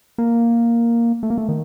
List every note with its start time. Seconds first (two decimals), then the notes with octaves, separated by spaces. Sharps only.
0.18 A#3
1.23 A3
1.30 A#3
1.38 A3
1.49 D#3